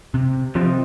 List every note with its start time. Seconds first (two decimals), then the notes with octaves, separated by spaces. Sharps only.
0.14 C3
0.55 C3 D#3 F3 C4